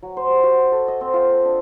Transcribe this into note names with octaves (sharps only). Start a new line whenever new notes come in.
F#3
C5
G4
F#4
A4
D#5
C4
F4
A4
D4